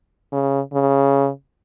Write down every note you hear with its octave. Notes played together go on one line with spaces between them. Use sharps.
C#3
C#3